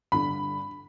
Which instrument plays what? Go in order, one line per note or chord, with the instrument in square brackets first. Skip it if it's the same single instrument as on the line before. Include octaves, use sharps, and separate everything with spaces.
[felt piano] G2 D3 [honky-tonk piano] B5